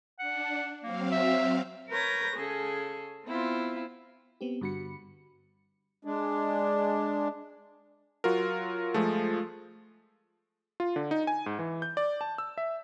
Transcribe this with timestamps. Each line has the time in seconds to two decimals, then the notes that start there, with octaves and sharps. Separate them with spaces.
0.20 D4 F#5
0.83 F#3 A#3 C4 F5
1.12 E5
1.90 A#4 B4 C#5 G6 A#6
2.35 C#3 G#4 A4
3.25 B3 C4 E4 F4
4.41 B3 C4 G4
4.61 G2 D3 F#4 B5 C#7
6.05 G#3 D4
8.24 F#3 F4 F#4 A#4
8.94 F3 G#3 A3
10.80 F4
10.96 D3
11.11 D#4
11.27 G#5
11.46 G#2
11.59 E3
11.82 G6
11.97 D5
12.21 A5
12.38 E6
12.58 E5